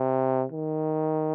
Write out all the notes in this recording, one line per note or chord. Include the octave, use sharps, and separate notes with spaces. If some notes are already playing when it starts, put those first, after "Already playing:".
Already playing: C3
D#3